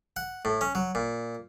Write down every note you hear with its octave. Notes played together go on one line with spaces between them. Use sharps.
F#5
A2
C#4
F#3
A#2